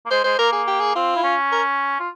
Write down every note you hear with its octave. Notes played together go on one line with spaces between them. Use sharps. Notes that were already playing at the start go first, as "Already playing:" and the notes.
A#3
G#3 C5
G#3 C5
A#3 A#4
G#4
G4
G#4
C4 F4
E4
C#4
A#4
F4